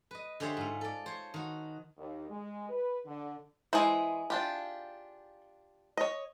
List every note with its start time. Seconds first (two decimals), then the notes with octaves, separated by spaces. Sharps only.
0.11 B4 D#5
0.40 D3 G4 G#4 C5 C#5 E5
0.57 G#2 F4
0.81 A4 D5
1.06 C5 C#5
1.34 D#3 F#4
1.98 D#2
2.30 G#3
2.69 B4
3.04 D3
3.73 E3 G#3 E4 G#4 C5
4.30 D4 F4 G4
5.97 C#5 D#5